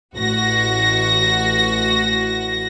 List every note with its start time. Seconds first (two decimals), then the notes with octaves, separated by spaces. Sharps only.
0.15 A1 F#4 A#6